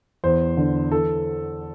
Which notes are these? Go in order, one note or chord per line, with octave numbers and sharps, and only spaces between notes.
E2 C5
D3
E3 A4